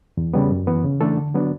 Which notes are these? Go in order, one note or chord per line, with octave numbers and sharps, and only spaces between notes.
E2
C#3 G3 B3
F#2
E3 B3
C#3
E3 A3 D4 A4
D3
F#3 B3 D4